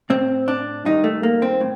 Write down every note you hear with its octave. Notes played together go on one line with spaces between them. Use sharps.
A2 C4
D4
G2 D#3 D#4
A3
A#3
C4
A2